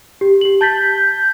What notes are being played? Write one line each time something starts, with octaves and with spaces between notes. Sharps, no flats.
G4
G4 F#7
A5 G6 A6 B6